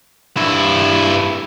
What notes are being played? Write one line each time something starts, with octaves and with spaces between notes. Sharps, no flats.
G2 E4